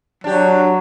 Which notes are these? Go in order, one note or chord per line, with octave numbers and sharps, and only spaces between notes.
F#3 D4 G4